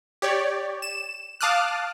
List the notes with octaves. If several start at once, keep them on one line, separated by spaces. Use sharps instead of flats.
G4 C#5 D5
E7
F5 A5 D6 D#6 F6 F#6